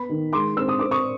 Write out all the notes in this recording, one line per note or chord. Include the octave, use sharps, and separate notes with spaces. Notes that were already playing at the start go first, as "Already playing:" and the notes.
Already playing: B3 B5
D#3
G#3 C6 D6
C4 E6
D#6
C4 D6
C#6 D#6